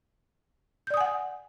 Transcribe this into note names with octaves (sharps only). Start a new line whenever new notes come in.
D5 F#5 G#5 D#6 G6